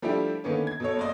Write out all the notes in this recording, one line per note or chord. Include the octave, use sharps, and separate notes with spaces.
F3 G3 A3 D4 E4 G4
D3 D#3 A#3 B3 C#4
G#6
B2 A4 C#5
F#1 D5 D#5